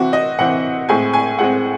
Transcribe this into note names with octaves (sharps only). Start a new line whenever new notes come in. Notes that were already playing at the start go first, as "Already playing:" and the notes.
Already playing: C3 E3 C4 F#4
D#5
C3 E3 C4 F#5
A2 G#3 C4 G#5
G#5
A2 G#3 C4 F#5